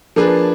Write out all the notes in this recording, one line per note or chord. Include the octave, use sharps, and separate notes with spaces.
F3 A#3 D4 G#4 B4